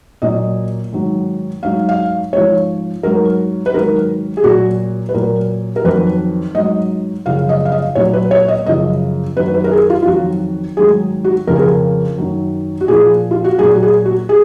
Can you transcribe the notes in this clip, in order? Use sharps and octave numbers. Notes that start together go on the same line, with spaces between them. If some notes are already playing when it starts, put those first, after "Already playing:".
A#2 F#3 D#5
G#2 D#3 F#3
G#2 F#3 F5
F5
G#2 F3 C#5
G#2 F#3 A#4
B4
G#2 D#3 F#3 A#4
G#4
A#2 F#3 F#4
B4
A#2 F#3 A#4
A#4
F2 D#3 F#3 B4
G#2 F#3 D#5
F#2 C#3 F3 F5
D#5
F5
D#5
A#2 F#3 C#5
B4
C#5
D#5
F#2 C#3 F3 D#5
F#2 D#3 F#3 B4
B4
A#4
G#4
F4
F4
F2 D#3 F#3 F#4
G#2 D#3 F#3 G#4
F#4
F2 C#3 F3 A#4
G#4
A#4
F#2 D#3 F#3
F#4
A#2 F3 G#4
F4
F#4
A#2 F#3 G#4
F#4
G#4
F#4
G#4